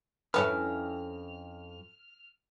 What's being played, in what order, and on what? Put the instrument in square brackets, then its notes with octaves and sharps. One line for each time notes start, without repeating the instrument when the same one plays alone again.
[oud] F2 C#4 E4 [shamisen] A4 B4 [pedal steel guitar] F6